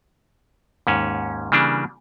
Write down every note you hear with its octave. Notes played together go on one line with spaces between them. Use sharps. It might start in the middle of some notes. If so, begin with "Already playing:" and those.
D#2 G#2 C#4
C#3 E3 G3 A#3 D4